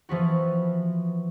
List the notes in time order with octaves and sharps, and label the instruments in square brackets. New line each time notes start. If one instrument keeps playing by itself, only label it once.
[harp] E3 F3 B3 F#4